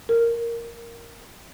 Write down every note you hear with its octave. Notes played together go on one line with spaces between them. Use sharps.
A#4